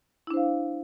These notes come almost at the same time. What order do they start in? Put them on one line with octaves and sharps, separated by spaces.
E4 D4 C5 F5